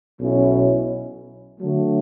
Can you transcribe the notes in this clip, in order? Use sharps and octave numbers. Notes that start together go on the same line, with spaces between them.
B1 B2 F#3 C#4 E4
D3 F#3 A3